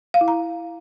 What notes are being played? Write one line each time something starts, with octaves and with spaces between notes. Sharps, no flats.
F5
E4
A#5